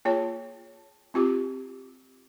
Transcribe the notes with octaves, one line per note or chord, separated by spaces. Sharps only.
A#3 F4 G#4 C#5 A5
C4 F4 G4 D6